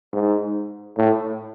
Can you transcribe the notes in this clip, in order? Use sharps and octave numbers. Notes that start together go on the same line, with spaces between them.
G#2
A2